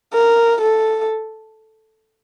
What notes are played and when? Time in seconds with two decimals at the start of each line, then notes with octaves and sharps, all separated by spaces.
0.13 A#4
0.61 A4